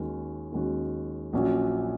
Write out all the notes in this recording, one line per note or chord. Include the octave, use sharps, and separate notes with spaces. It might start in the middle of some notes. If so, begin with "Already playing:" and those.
Already playing: D#2 D#3 G#3 C#4 F#4
D#2 D#3 G#3 C#4 F#4
A#1 A#2 F#3 C#4 F#4